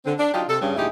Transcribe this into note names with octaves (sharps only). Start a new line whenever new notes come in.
D3 C4
D4
F#3 D4 D#4 F4 G4
C3 A4
G2 C#3
D2 A#2 D#4 E4 G4 G#4